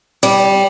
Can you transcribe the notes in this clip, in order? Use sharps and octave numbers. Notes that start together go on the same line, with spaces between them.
G3